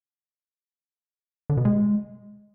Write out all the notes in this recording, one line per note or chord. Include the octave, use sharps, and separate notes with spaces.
D3
B2
G#3